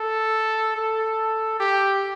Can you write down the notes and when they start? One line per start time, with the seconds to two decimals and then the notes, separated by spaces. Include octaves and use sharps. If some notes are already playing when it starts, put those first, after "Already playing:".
Already playing: A4
0.76 A4
1.60 G4